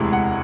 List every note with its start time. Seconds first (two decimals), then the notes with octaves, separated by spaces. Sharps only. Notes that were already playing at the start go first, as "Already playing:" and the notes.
Already playing: E1 D2 C3 E3 G#3
0.13 F#5